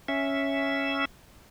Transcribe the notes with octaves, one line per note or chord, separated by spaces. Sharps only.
C#4 E5